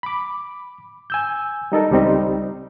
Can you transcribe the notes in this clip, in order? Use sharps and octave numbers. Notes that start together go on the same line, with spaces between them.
B5 D6
G#5 E6 G6
G3 D#4 A4 A#4
C#2 G3 C4 D#4